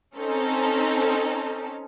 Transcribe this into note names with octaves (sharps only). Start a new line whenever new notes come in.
C4 C#4 D#4 A4